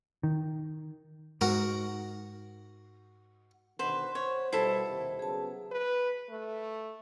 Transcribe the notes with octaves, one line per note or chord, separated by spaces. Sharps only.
D#3
G#2 F#4 A#4
B2 D3 D#3 B4 C5 F#5
C5 C#5
B2 G3 E4 A4 C5
D#2 C3 D#3
C#3 F#3 B3 G#4 A5
B4
A3